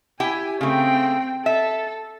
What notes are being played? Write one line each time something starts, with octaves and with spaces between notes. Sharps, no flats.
E4 G4 G5 G#5
C#3 A3 C4 G5
A4 E5